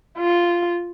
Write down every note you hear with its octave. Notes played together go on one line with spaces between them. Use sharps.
F4